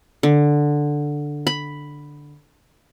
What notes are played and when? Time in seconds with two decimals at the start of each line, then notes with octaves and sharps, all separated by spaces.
0.23 D3
1.47 B5